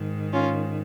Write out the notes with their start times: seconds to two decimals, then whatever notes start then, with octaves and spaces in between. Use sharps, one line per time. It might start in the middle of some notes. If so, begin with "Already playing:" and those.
Already playing: G#2 D#3
0.32 C#4 F4